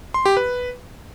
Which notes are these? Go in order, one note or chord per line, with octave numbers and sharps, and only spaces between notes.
C6
G4
B4